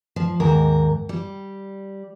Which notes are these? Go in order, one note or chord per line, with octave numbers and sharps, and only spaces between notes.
F3
D#2 G#2 A#4
G3